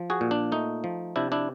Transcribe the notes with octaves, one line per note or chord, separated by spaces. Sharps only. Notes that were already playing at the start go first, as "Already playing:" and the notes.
Already playing: F3
F#4 G#4
A#2
D4
A3 D#4
F3
C3 D4 E4
D4 E4